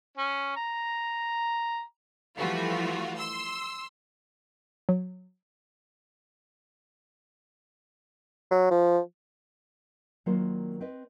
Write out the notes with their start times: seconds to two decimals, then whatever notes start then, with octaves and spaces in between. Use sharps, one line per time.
0.17 C#4
0.56 A#5
2.38 E3 F3 G3 A3 F4 F#4
3.17 C6 E6
4.89 F#3
8.51 F#3
8.71 F3
10.26 D#3 F#3 A#3 D4 F4 C5
10.80 C4 B4 D#5